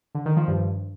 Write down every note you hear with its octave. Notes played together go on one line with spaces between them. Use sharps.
D3
D#3
F3
G2